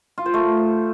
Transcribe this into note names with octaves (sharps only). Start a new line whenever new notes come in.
F4
C5
A3